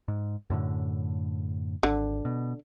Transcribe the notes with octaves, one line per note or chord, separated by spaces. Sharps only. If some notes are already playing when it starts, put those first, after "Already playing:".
G#2
F#2 A2 D3
G#1 D3
B2